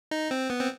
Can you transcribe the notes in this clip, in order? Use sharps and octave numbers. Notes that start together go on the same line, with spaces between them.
D#4
C4
B3
C4